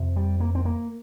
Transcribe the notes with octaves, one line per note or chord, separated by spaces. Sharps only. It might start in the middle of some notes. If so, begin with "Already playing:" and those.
Already playing: F2 C3
G3
A#3
C4
A#3